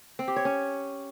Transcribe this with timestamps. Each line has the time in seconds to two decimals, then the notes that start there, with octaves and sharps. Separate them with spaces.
0.19 C4
0.28 G4
0.36 C#5
0.45 C#4